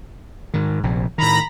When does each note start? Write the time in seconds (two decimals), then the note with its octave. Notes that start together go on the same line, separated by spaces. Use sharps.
0.54 G#2 D#3
0.83 A#1 C3
1.18 A2 D#3 A#5 B5 A#6